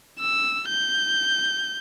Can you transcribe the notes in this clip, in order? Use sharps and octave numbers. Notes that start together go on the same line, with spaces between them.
E6
G6